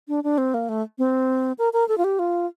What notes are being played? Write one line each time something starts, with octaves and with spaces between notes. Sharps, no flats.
D4
D4
C4
A#3
A3
C4
A#4
A#4
A4
F4
G4
F4